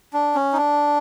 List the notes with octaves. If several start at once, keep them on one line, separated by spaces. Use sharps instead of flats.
D4
C#4
D#4
D4